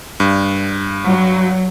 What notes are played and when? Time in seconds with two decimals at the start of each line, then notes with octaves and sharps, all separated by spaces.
0.20 G2
1.05 F#3